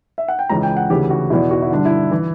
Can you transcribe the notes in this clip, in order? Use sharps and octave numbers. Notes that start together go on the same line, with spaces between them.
E5
F#5
G5
C#2 C#3 E3 A#5
G5
F#5
D2 C#3 E3 G4
F#4
E2 B2 E4
F#4
E4
G2 D3 D4
E4
E3